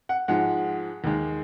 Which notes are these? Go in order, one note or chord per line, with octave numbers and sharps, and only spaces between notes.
F#5
G#2 F3 G#3 F#5
D#2 D#3 G#3